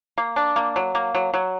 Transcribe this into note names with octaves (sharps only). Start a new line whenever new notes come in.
A#3
D4
A#3
F#3
A#3
F#3
F#3